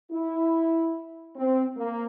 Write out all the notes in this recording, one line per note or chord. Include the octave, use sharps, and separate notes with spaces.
E4
C4
A#3